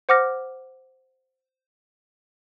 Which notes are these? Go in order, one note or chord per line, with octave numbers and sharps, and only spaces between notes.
C5 F#5 D6 F6 A#6